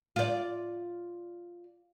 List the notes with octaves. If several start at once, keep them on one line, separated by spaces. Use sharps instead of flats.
F4 D5